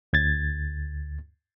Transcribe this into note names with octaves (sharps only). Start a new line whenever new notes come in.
D2 G#6 A6